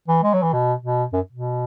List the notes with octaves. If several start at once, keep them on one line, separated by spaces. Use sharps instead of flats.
E3
G#3
F#3
E3
B2
B2
F#2
B2